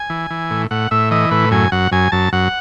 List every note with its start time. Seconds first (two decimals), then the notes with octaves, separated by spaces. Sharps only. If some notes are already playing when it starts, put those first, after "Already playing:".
Already playing: G#5
0.10 E3
0.30 E3
0.51 A2
0.71 A2 F#5
0.91 A2 E5
1.11 E3 D#5
1.31 A2 B4
1.51 F#2 G#5
1.72 F#2 F#5
1.92 F#2 G#5
2.12 F#2 A5
2.33 F#2 F#5